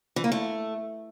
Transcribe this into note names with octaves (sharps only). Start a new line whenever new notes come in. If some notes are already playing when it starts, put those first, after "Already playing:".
E3
A#3
A3